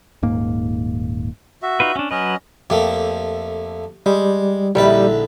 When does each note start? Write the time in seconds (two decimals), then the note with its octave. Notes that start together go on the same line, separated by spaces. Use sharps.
0.23 D#1 G#2 A#3
1.62 F#4 E5
1.80 D#4 F4 B4
1.96 C#4 D4
2.11 F#3 C#4 B4 D#5
2.70 F2 A3 A#3 G4
4.06 G3 G#3
4.75 A#1 D3 G3 D#4 E4 B4